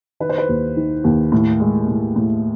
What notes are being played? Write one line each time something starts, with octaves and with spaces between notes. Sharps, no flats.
D#3 B4
C5
B4
D#2
D#3
D#2
A2
G#3
A2
A2